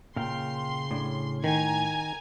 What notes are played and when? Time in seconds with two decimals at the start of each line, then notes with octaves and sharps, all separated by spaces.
0.16 A#2 C#3 F5 G5 C6
0.91 A2 D4
1.44 D#3 G#5 A#5 G#6